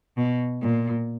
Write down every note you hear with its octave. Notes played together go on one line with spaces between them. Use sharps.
B2
A#2